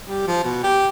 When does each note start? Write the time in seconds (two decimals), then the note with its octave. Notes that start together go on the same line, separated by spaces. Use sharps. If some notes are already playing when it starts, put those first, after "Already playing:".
0.06 G3
0.27 F3
0.44 B2
0.64 G4